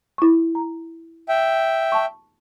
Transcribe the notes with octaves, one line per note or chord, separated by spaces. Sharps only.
E4 C#6
A#5
E5 G5
A5 C#6